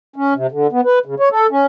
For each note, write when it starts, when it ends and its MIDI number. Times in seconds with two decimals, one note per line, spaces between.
0.16 0.34 61
0.35 0.47 48
0.52 0.67 50
0.72 0.81 59
0.85 0.99 71
1.06 1.15 49
1.20 1.29 73
1.32 1.47 69
1.51 1.66 61